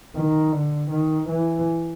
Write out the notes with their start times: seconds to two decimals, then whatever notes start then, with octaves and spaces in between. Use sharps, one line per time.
0.16 D#3
0.53 D3
0.91 D#3
1.29 E3